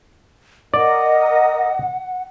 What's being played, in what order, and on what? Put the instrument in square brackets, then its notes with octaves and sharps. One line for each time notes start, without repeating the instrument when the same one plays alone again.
[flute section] A#4 D#5 [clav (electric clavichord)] D5 [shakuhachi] F#5